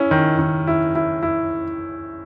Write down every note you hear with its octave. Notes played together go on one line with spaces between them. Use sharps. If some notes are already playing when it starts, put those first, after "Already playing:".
Already playing: C#4 E4
D#3
D#3
E4
E4
E4